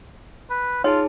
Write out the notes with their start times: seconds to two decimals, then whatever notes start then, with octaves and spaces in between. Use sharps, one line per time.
0.50 B4
0.84 D#4 F4 G#4 C#5 A5